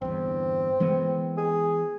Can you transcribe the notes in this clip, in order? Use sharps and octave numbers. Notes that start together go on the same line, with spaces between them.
G1 E2 C4
E3 G#3 B3
G#4